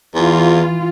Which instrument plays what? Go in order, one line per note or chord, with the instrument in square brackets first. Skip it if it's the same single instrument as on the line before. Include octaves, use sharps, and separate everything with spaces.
[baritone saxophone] E2 [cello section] E3 F4